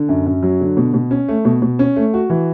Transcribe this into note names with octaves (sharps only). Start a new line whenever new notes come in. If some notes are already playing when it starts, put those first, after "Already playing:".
Already playing: D3
F#2
F#2
F#3
D3
B2
B2
C#4
A3
B2
B2
C#4
A3
F#4
E3